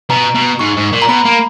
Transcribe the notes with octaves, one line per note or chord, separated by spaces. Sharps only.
B2 A#5
B2
G#2 C#6
G#2
A#2
A#5
B2 B5
A#3